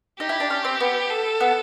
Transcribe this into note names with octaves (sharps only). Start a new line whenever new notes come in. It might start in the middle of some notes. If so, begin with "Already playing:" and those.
D#4 G4
E4
D4
C#4
C4
B3
A4
B3